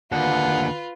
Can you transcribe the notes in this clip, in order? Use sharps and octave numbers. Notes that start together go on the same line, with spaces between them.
D#2 D3 F4 B4 F#5